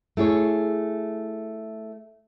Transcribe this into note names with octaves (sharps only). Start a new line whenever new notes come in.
A3 E4 G#4 C#5